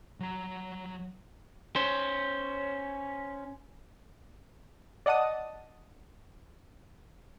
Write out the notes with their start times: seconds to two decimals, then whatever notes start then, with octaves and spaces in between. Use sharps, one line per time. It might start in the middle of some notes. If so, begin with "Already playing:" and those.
0.20 F#3 A#5
1.76 C#4 C5
5.06 D5 D#5 F#5 A5 D#6